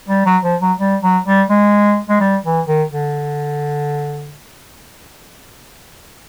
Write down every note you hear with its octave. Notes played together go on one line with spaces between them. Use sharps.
G3
F#3
F3
F#3
G3
F#3
G3
G#3
G#3
G3
E3
D#3
D3